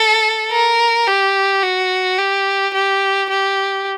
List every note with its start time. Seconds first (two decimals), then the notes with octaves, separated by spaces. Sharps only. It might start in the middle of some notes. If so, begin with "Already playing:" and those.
Already playing: A4
0.51 A#4
1.07 G4
1.63 F#4
2.18 G4
2.73 G4
3.29 G4